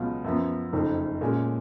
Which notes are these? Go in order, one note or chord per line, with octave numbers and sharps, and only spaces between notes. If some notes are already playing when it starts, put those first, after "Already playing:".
Already playing: C#2 B2 F#3 B3 F4
F#2 F3 B3
F#1 F2 D#3
A#2 G#3 C#4